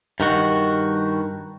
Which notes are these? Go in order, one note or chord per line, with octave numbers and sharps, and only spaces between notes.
G2 D#3 F#4